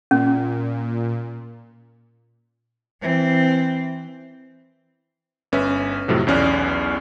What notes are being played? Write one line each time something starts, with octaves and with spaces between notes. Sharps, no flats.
A#2 C#4
E3 C4
G1 C#4 B4 E5
F2 A2 C3 F#3
B1 E2 C#4 D5 F6 F#6